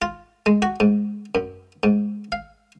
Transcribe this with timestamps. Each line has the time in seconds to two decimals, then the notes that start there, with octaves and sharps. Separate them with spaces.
0.02 F4
0.46 G#3
0.62 F#4
0.80 G#2
1.35 F#2
1.83 G#2
2.32 F5